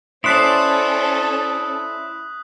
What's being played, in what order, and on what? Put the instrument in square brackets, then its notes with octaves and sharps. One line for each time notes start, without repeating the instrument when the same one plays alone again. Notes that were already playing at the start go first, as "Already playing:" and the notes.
[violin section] C#4 A4 [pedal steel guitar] E4 C5 D5 [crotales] D#6 F#6 B6